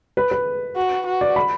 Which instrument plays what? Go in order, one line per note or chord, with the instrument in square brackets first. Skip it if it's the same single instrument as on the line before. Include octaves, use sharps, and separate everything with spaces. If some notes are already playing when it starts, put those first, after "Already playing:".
[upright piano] B4
B4
[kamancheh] F#4
F#4
[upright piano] D5
B5